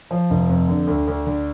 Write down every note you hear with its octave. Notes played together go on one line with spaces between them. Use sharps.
F3
F1
F2
D3
D2
D2
D3